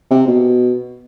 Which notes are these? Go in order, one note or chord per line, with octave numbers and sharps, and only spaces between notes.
C3
B2